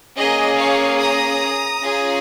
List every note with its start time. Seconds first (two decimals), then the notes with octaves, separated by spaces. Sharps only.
0.16 A#3 C#4 G#4 D#5
0.57 C#5 F5
0.99 A#5 D#6
1.82 C#4 F4 G#4